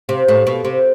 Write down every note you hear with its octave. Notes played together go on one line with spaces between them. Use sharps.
C3
A2
B2
C3